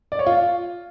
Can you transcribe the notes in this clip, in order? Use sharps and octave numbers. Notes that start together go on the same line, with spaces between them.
D5
C#5
F4